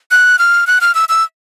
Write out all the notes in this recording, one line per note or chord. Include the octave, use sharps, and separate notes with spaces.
F#6
F6
F#6
F6
E6
E6